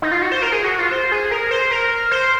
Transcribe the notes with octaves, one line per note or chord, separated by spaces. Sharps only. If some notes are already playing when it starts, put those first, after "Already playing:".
D#4
F4
F#4
C5
A#4
G#4
F#4
F4
C5
G#4
A#4
C5
A#4
C5